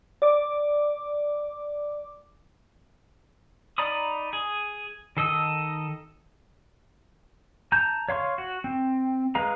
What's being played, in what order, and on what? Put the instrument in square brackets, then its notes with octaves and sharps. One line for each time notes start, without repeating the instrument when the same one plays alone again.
[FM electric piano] D5 D6
[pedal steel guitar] D#4 D5 A#5 B5 D#6
G#4
D#3 A4 D#5 E6
A5 A#5 G6
C#5 F5 C6 C#6
F#4
C4
G#3 B4 F5 A#5